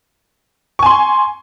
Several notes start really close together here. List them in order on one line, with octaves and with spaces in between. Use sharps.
C#6 G#5 C6